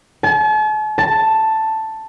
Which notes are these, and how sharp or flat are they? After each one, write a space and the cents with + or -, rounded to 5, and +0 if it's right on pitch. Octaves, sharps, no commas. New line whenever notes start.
A5 -45
A5 +5